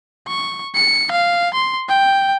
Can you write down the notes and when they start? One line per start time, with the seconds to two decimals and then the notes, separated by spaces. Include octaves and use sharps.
0.28 C#6
0.75 C#7
1.11 F5
1.54 C6
1.89 G5